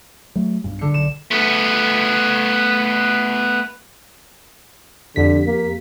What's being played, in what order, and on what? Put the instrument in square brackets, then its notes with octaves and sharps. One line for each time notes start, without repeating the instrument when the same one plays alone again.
[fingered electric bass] F#3 A3
B1 G2
[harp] D3 C#7
[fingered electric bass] B1 [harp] E7
[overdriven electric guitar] A3 B3
[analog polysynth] F2 B6 [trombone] D3 [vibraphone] G4
[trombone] A#3